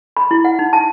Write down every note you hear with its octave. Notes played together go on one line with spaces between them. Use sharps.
B5
E4
F#5
D#4
A5